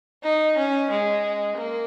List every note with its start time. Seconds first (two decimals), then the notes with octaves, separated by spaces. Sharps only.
0.23 D#4
0.57 C#4
0.90 G#3
1.56 A#3